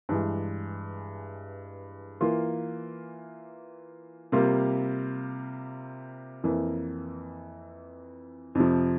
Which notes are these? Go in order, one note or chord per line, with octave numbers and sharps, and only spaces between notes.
G2 E3 G#3
E3 A#3 F4
C3 G3 A#3 F4
F2 E3 A#3
F2 C3 F3